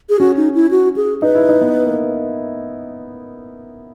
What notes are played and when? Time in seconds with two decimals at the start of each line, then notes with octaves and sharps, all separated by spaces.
0.09 G#4
0.19 C#4 F#4
0.37 D#4
0.55 E4
0.71 F#4
0.96 G#4
1.22 D#4 B4
1.35 E4
1.49 D#4
1.61 B3
1.86 A#3